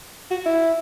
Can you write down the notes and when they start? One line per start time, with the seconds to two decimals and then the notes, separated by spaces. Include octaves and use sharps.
0.31 F#4
0.46 E4